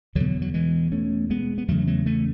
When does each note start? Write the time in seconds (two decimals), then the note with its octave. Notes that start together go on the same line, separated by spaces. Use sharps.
0.15 E2 B2 D3 F#3
0.42 F#3
0.54 E3 G#3
0.92 A3 C#4
1.30 G#3 B3
1.58 B3
1.68 E2 C#3 F#3 A3
1.87 F#3 A3
2.06 A3 C#4